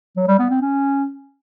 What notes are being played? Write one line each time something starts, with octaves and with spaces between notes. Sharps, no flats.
F#3
G3
B3
C4
C#4